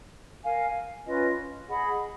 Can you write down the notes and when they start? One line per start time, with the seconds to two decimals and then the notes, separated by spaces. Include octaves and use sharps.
0.44 A#4 F5 G#5
1.06 C#4 F4 B4 D#5
1.68 G#4 D#5 F#5 B5